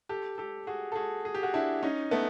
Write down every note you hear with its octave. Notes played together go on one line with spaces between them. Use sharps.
G4 A4
G4 A4
F#4 G#4
A4
F#4 G#4
G#4
G4
F#4 G#4
D4 E4
C#4 D#4
A3 B3